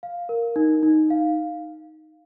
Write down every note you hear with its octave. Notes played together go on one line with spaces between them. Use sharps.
F5
A#4
D#4
D#4
F5